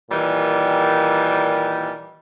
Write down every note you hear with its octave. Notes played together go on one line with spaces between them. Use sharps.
A#2 D#3 E3 G3